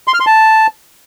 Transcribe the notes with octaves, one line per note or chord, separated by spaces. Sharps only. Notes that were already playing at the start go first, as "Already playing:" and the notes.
C6
F6
C6
A5